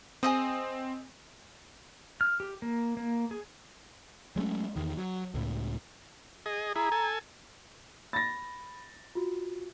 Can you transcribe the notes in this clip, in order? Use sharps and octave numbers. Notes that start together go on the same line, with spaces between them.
C4 G#4 D#5 D#6
F6
G4
A#3
A#3
G#4
F#3 G#3 A3 C#4
E2 D#3
F#3
C#2 A2
G#4 D#5
E4 G#4 A#5
A4 G#5
B5 A6 A#6
F4 F#4